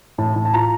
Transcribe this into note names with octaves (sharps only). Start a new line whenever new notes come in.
A2 A5
A2
A5
F4 A#5